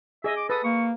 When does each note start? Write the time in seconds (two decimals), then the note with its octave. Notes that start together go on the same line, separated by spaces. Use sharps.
0.24 G#4 D#5 E5
0.37 D6
0.50 A4 B4 D#6
0.64 A#3 C#6